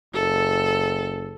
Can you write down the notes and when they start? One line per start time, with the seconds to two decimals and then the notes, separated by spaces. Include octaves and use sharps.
0.14 F#1 A4